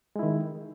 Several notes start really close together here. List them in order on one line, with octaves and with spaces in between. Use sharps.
G#3 E4 D#3